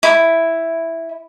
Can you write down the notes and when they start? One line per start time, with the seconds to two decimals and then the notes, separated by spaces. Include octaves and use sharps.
0.03 E4